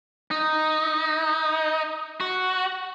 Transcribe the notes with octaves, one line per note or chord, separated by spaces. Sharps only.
D#4
F#4